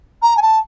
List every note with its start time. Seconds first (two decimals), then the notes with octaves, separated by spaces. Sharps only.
0.22 A#5
0.37 G#5
0.42 A5